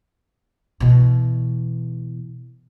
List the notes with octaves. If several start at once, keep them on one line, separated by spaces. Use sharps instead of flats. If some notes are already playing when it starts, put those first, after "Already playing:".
B2 E3